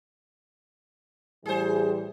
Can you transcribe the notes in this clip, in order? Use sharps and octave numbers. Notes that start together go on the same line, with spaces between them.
A2 E3 G3 G#4 C5